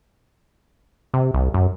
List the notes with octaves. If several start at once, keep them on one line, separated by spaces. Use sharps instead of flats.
C3
C2
F#2